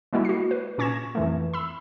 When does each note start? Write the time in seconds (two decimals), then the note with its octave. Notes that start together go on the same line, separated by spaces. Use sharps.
0.13 G3 G#3 A#3 E4 F#4 G4
0.25 F#4 C7
0.51 B4
0.78 A#2 C#4 C#6 G#6 A#6 E7
1.15 F2 E3 A3
1.54 B5 E6